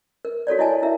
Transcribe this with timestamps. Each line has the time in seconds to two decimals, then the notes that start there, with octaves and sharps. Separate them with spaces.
0.25 A#4
0.47 F#4 A4 C#5 D5
0.59 E4 D#5 G#5 A5
0.82 E4 A#4 E5